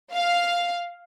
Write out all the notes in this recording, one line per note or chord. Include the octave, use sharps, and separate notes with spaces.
F5